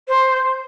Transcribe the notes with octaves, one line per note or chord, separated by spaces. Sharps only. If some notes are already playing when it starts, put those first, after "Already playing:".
C5